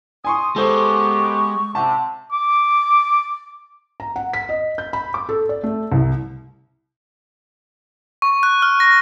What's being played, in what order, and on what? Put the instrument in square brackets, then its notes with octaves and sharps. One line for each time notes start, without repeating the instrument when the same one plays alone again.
[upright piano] G#5 C6 C#6 [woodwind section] D#6
[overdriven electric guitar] G#3 [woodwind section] B3 G4 [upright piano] A4 C5 [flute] C#6
[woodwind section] C3 [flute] F#5 [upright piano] A5
[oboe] D6
[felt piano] A#5
F#5
B6
D#5
G6
B5
D6
A4
D5
A3
C2
[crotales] C#6
F#6
F6
A#6